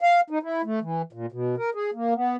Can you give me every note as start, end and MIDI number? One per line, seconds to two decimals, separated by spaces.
0.01 0.21 77
0.30 0.39 63
0.43 0.62 64
0.65 0.79 57
0.82 1.02 52
1.13 1.26 46
1.32 1.55 47
1.58 1.70 70
1.75 1.90 68
1.94 2.14 58
2.15 2.36 59